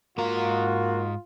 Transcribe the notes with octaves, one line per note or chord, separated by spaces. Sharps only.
G#2 A#3 F4 F#4 A#5